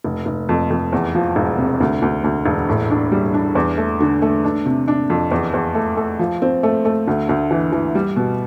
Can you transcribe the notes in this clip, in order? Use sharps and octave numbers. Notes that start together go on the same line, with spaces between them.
F1
F1
F2
F2
E2
F3
E1
C3
D2
D2
D2
E1
A2
D4
G3
D4
E2
A3
D3
A3
D4
C3
D4
F2
E2
E2
A3
A3
F3
C4
A3
A3
D2
D2
E3
E3
G3
B2